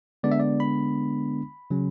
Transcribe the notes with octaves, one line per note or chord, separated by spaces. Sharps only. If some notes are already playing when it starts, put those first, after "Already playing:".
D3 G#3 B3 D4 D5
E5
D5
B5
C#3 F#3 C#4